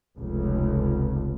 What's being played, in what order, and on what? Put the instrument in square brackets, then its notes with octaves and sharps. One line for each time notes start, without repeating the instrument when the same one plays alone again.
[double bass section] F1 C#2